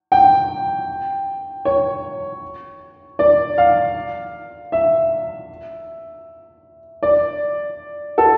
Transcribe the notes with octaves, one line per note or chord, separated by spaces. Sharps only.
G5
C#5
D5
F5
E5
D5
A4